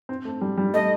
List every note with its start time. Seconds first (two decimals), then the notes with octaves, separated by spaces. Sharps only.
0.09 C4
0.25 A3
0.41 G3
0.57 G3
0.74 A3 D#5